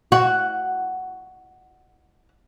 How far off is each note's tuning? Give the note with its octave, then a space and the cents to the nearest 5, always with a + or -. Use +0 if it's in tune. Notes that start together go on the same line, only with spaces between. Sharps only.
F#4 +5